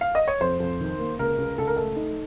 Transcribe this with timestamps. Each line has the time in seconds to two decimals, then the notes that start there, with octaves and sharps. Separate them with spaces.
0.01 F5
0.15 D#5
0.28 C#5
0.41 F2 C5
0.60 F2
0.80 D#3
0.99 A#3
1.19 C#2 A#4
1.38 C#2
1.58 C#2 A4
1.67 A#4
1.76 A3 A4
1.96 D#4